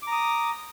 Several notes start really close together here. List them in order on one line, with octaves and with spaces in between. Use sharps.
D6 A#5 D#6